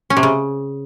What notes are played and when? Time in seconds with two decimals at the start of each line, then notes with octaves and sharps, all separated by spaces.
0.10 C#4
0.17 C3
0.23 C#3